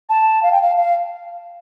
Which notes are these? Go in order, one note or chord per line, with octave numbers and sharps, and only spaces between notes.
A5
F5
G5
F5
F5